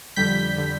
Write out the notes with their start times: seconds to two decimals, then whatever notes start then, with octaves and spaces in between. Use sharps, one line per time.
0.16 F2 D3 G3 G6 B6
0.56 D3 G3